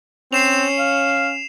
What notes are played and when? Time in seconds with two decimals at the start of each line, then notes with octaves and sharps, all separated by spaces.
0.33 C4 C#4 C7 E7 F7
0.79 F5